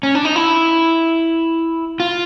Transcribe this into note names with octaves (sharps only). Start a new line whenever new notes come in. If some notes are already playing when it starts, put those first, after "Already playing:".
C#4
D4
D#4
E4
F4